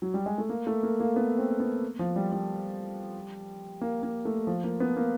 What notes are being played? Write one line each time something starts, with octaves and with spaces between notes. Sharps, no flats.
F#3
G3
G#3
A3
A#3
A3
A#3
A#3
B3
C4
B3
F3
G3
G3
A#3
A#3
A3
F3
A#3
B3
A#3